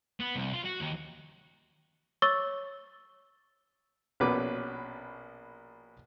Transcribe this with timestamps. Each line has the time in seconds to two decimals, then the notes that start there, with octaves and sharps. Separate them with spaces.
0.20 B3
0.35 C2
0.54 F4
0.65 F#4
0.81 D#2
2.22 C#5 C#6 D6 E6 A6 G7
4.20 A#1 B2 C#4 B4 D6